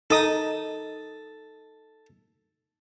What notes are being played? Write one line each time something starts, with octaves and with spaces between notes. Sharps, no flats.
D#4 A4 D#6